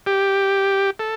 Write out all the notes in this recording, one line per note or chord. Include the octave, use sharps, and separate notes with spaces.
G4
A4